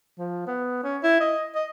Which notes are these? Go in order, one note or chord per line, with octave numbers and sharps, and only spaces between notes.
F3
B3
C#4
E4
D#5
D#5